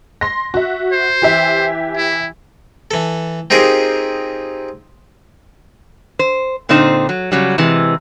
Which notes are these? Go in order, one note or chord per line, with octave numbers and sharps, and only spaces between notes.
C6 A#6
F#4 E5
C5
E3 G4 E5
E4
E3 A4
C4 D#4 F4 G4 G#4 A#4
C5
A#2 D3 C4 D#4 C5
F#3
C#3 F#3 G3
C3 E3 G#3